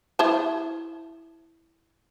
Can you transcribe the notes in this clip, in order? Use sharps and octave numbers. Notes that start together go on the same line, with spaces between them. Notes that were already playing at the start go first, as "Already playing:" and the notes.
E4 C5 A5